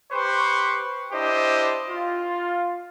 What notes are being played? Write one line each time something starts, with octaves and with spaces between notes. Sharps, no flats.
G4 B4 C5 C#6
D4 E4 G4 C5 D#5
F4